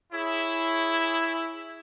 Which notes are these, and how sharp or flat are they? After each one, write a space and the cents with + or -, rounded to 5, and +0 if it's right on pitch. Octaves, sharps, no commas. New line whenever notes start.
E4 +0 G#4 +0 C#5 +0